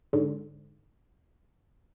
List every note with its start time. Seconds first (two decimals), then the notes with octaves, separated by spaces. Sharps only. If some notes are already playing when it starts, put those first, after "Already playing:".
0.13 G#2 D3